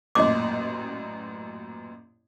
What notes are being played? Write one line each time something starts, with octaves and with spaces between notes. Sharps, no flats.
A1 F#2 A#2 D#5 D6